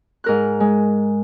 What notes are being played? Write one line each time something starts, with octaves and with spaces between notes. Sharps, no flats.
G#2 A#4 F#6
G#3